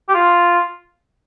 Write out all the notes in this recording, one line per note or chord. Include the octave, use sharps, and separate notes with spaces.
G4
F4